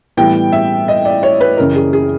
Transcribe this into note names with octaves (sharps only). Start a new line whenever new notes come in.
A2 E3 G3 B3 G5
E5
D#5
D5
C#5
B4
F#2 C#3 E3 A#4
G#4
G#4